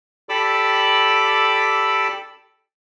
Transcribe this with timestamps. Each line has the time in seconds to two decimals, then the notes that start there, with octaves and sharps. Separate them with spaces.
0.29 G4 A4 D5 B5 D6 E6